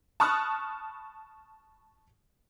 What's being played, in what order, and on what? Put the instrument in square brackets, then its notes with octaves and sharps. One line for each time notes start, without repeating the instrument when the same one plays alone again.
[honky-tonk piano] A5 B5 C#6 D#6 F6 F#6